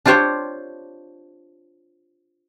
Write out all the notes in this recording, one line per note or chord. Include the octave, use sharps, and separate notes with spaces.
D4 F4 G4 C5 C#5 G5